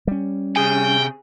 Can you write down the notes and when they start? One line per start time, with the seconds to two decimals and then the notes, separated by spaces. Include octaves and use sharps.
0.07 G3 C#4
0.56 C3 G#4 G5 G#5